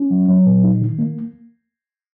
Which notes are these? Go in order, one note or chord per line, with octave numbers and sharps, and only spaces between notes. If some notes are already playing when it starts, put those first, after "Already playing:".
Already playing: C#4
F#3
F#3
A#2
D#4
D#3
A#3